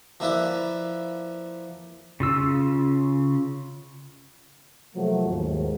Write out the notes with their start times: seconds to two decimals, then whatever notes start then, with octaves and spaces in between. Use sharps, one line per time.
0.20 F3 A#3 E4 B4 D5
2.20 C#3 F4 E6
4.95 C3 F3 F#3 A3 A#3 F#4
5.26 D#2 G#2